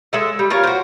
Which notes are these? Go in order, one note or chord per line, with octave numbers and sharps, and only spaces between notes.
G#3 A4 E5
G3
F4 A#4 C#5
F#4 C5